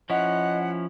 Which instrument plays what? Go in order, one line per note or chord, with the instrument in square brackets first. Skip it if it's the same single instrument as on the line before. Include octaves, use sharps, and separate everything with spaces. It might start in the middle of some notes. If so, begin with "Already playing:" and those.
[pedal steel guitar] F3 C#4 E4 [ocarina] D#5 [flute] F#5